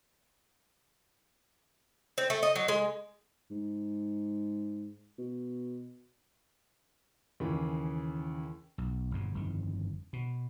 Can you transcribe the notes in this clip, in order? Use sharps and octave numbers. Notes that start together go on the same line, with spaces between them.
C4
A3
D#5
F#3
G#3
G#2
B2
D#2 C#3 E3
B1
G1 E2 B2
G1 F2 D#3
B2